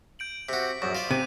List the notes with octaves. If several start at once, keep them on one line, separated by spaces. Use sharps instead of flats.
G6 D7 F#7
C3 F#4 B6
A#1 F#2 C#6
F4 D5
C3 D6 F#6 D#7